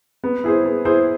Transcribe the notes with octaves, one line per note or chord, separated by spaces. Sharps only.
B3
E4 G#4 C5
B3
E4 G#4 C5